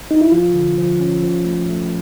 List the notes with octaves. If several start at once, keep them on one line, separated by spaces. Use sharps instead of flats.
D#4
E4
F3 F4
D3
F3
C#4
F3
A3
A3